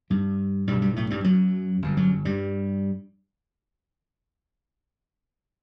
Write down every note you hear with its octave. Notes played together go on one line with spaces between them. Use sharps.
G2 G3
B1 G2 B2 G3
G2 G3
A2 A3
G2 G3
F#2 F#3
G1 F#2
F#2 F#3
G2 G3